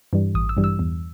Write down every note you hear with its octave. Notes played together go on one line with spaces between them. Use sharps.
G2 E3 G3
A1 D#6
E6
G2 E3 G3
E6
E2